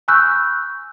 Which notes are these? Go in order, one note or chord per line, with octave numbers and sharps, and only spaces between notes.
G#5 B5 C#6 E6 F#6 G6